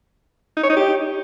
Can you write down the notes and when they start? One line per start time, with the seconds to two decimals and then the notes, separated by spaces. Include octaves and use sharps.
0.57 D#4
0.63 C#5
0.70 D#4
0.76 G4